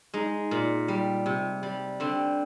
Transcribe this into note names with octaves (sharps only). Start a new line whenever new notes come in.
G#3 D#4
A#2
G3
C3
G3
D3 C4